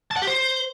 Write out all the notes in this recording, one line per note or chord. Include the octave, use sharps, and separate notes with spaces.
A5
F#5
G4
C5